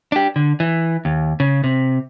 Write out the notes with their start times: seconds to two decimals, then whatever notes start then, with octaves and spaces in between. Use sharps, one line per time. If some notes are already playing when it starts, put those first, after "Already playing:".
0.12 D4 G4
0.36 D3
0.60 E3
1.05 D#2
1.40 C#3
1.64 C3